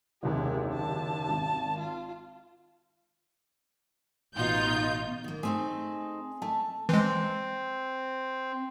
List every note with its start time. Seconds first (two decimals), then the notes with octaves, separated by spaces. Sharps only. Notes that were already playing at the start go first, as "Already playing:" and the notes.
0.23 F#1 D#2 C3 G#3
0.74 A5
1.29 G#1
1.79 F4
4.35 A1 B2 D#4 F4 G6
5.24 D#3 A#3
5.43 A3 C4 D#4 G#4
6.42 A3 A5
6.89 E3 G#3 C4